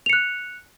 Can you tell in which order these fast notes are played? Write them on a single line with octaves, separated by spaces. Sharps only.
F7 C#7 F#6